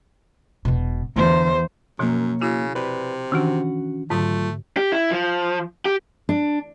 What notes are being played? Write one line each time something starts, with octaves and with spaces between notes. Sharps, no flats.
E1 B2
E2 D3 C5
F#2 B2 F3 A#3 C#5
C#3 E4 F#4
C3 B4 D5 B5
D#3 E3 C#4 D4 F#4 F#5
G#2 D3 F#3 A3 F4
G4
E4
F3
G4
D4